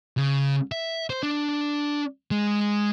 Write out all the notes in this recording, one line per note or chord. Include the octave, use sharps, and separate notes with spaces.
C#3
E5
C5
D4
G#3